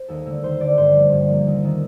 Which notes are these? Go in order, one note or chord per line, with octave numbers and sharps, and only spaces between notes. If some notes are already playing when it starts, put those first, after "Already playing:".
Already playing: C5
D#2 A4
D3 A3
D#2 C5
D3 A3 D5
G2 C5
F3 A#3
G2
F3 A#3
D#2
D#3 A3